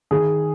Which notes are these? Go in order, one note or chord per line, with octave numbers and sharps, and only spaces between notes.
D#3 G#4